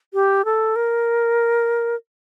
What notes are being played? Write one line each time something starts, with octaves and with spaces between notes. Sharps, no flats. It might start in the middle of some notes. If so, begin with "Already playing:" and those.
G4
A4
A#4